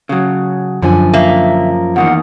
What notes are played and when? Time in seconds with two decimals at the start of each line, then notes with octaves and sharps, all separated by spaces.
0.09 C#3 F#3
0.82 F#2 D3 F3 G#5
1.14 A#3 E5
1.96 E2 D#3 A#3 F#5